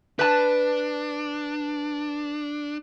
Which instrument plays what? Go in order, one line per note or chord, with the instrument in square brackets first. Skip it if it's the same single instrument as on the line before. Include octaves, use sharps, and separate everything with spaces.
[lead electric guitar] D4 [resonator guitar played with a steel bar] B4 A5